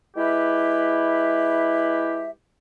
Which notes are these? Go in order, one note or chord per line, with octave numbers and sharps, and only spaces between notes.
G#3 E4 G4 B4 E5